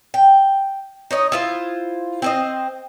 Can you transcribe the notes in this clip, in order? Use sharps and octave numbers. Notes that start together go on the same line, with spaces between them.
G5
D#4 C#5 D#5
E4 F4 C5
C4 C5 D#5